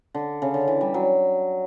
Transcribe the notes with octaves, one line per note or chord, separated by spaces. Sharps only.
D3
C#3
D3
E3
G3
F#3